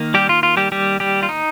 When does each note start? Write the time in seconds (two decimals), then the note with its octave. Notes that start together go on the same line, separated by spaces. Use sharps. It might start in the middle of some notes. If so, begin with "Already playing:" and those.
Already playing: D#3 A#3
0.14 G3 G4
0.29 F4
0.43 F4
0.57 G3 G4
0.72 G3 G4
1.00 G3 G4
1.23 F4
1.29 D#4